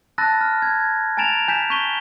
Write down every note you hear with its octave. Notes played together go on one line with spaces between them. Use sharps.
A5 B5 E6 F#6 A6 A#6
F6
G#6
G#5 A#5 A6 D7 E7 F7
G#5 G6 B6 E7
G#5 C#6 G6 B6 D#7 G7